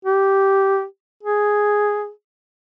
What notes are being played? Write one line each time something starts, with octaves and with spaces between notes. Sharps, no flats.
G4
G#4